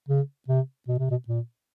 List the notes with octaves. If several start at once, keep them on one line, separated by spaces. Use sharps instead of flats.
C#3
C3
B2
C3
B2
A#2